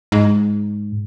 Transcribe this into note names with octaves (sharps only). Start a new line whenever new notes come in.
G#2